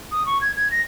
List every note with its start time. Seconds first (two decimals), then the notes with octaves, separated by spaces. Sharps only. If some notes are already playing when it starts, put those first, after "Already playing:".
0.12 D#6
0.26 C#6
0.41 G#6
0.56 G#6
0.71 A#6